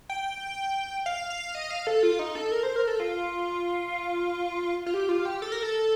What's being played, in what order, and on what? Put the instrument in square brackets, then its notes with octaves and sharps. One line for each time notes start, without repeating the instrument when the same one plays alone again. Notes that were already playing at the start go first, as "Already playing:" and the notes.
[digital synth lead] G5
F5
F5
D#5
F5
A4
F4
D#4
A4
A#4
C5
A#4
A4
F4
F4
G4
F4
G4
A4
A#4
A4